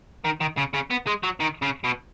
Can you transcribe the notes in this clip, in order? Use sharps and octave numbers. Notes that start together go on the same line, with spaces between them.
D#3
D#3
C#3
C#3
B3
G#3
F#3
D#3
C#3
B2